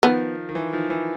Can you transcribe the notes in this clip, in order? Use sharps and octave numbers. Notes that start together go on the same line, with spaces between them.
D#3 F3 B3
D#3
E3
D#3 F3
E3